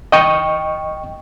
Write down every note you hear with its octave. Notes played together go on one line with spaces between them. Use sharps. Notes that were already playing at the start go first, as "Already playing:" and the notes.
D#5 G5 C#6